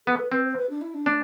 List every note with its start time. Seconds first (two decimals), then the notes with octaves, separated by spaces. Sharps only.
0.06 B3 A4
0.19 B4
0.32 C4 B4
0.44 C5
0.57 B4
0.70 D4
0.81 E4
0.94 D4
1.06 A3 D4